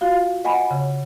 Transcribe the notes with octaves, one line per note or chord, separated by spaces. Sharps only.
F4 F#4 F5
D#5 F#5 G#5 B5
C#3